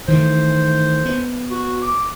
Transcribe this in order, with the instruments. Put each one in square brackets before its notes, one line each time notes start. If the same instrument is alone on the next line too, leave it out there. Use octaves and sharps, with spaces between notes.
[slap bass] D#3 E3 A3 [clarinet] C5
[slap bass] B3
[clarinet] F#4
D6